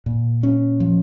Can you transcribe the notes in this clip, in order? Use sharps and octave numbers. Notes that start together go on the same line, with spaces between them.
A#2
C#4
F3